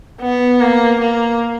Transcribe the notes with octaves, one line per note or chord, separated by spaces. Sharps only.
B3
A#3
A#3